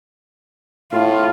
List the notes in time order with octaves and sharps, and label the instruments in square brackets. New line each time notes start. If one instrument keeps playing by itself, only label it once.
[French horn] A2 [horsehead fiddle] F4